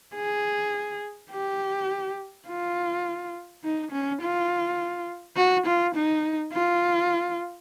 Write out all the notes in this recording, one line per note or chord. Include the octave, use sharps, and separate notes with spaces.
G#4
G4
F4
D#4
C#4
F4
F#4
F4
D#4
F4